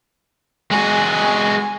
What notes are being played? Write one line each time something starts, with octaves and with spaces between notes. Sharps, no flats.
G#3 F#4 G#5